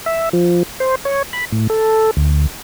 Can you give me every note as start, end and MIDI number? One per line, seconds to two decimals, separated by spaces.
0.06 0.29 76
0.33 0.63 53
0.80 0.95 72
1.05 1.22 73
1.33 1.45 83
1.52 1.67 45
1.70 2.11 69
2.17 2.47 38